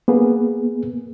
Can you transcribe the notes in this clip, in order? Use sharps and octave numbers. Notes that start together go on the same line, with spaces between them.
A#3 B3 G#4